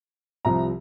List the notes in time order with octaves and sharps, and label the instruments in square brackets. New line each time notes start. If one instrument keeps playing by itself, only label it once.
[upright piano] C2 C3 F3 A#5